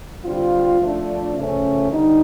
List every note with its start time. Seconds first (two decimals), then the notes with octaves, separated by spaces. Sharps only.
0.24 D3 G3 C4 F4
0.79 F3 A3 D4
1.34 C#3 F3 A3 C#4
1.89 D3 G3 B3 D#4